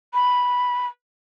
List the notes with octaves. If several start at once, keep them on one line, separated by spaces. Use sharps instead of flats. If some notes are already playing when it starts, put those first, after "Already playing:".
B5